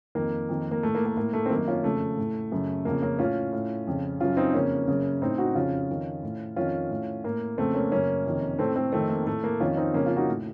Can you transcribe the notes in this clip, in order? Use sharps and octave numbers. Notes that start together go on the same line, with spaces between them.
F2 D#3 A#3
F2 D#3
A#3
A2 A3
A#3
A#3
A2 A#3
A3
C4
F#2 D#3 A#3
C#4 F4
F2 C#3 A3
A2
F#2 C#3
F2 C#3 A#3
A#3 C#4
A2 C#4 F4
A2
F2 C#3
F#2 C#3 C#4 F4
C4 D#4
F2 C#3 A#3 C#4
F#2 C#3
A2 C4 D#4
D#4 F#4
F2 C#3 C#4 F4
F2 D#3
A2
F2 D#3 C#4 F4
A2
A2 A#3
F2 C#3 A3 C4
A#3 C#4
F#2 C#3 A#3 C#4
F2 C3 D#3
A2 A3 C4
A3 C4
F2 D#3 A3 C4
A#3
A2 A3
A#3
F2 D#3 C#4 F4
C4 D#4
F2 C#3 A#3 C#4
C#4 F4
D#4 F#4
A2